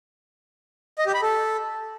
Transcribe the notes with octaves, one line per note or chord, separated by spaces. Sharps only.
D#5
G4
B5
A4